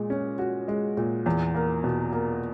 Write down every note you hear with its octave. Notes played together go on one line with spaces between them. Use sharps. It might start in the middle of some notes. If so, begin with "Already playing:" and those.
Already playing: A#2 G#3
C#4
F#4
G#3
A#2
E2
A#3
B2
A#3